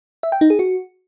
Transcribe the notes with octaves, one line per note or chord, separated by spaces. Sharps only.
E5
G5
D#4
G#4
F#4